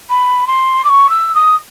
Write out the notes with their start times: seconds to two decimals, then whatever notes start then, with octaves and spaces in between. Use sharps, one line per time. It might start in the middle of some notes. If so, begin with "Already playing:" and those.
0.10 B5
0.47 C6
0.84 D6
0.89 C#6
1.09 E6
1.35 D#6